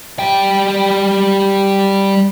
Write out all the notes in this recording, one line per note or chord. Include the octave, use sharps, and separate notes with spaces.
G3 G5